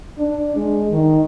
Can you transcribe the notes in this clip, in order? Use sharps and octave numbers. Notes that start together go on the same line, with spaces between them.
D4
G#3
D#3